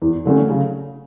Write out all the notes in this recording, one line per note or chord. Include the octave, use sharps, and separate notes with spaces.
E2
D3 F#3 A3 C#4
C#3